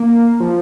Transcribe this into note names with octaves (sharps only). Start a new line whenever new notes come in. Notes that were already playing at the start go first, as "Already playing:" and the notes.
Already playing: A#3
F3